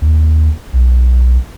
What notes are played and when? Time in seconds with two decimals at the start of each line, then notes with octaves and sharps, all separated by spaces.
0.02 D#2
0.73 B1